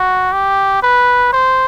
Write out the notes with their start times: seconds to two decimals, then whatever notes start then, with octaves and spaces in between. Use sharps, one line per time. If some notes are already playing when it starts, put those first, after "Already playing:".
Already playing: F#4
0.33 G4
0.83 B4
1.33 C5